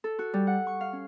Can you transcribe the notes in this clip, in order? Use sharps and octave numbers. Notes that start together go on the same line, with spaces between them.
A4
F#4
G3
F#5
C#6
F5
C#4